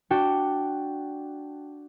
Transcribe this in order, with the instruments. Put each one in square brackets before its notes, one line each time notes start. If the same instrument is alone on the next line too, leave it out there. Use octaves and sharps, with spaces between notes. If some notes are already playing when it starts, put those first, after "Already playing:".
[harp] D4 F#4 G5